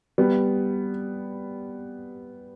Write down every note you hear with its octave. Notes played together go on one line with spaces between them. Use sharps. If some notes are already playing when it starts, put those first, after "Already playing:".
G3 B3